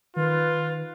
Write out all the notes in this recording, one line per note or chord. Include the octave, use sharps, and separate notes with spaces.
D#3 F4 B4